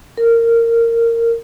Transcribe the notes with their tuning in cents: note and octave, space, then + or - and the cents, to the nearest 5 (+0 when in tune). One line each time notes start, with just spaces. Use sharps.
A#4 -15